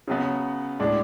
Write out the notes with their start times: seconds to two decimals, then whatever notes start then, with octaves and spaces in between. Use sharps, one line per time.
0.08 C#3 F#3 B3
0.80 A2 G#3 D4